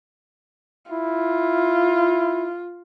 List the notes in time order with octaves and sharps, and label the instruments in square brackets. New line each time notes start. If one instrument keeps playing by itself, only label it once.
[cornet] E4 [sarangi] F4